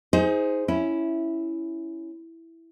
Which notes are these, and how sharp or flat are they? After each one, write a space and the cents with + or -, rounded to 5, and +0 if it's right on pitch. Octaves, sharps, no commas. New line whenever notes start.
D#4 +30 G#4 +0 C5 -10
C#4 +0 E4 +0